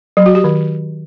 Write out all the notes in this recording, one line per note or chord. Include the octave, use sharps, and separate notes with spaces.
F#3
F#4
G4
D#3